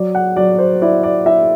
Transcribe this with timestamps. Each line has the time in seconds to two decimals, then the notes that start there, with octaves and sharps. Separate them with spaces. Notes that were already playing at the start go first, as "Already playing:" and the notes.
Already playing: F#3 D5
0.15 F#5
0.37 F#3 D5
0.59 C5
0.82 E4 D5
1.03 D5
1.26 E4 E5